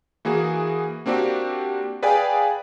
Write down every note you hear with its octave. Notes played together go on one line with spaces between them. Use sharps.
E3 A#3 F#4 G#4
A#3 C4 D4 F#4 G4
G#4 B4 D5 F5 G5 G#5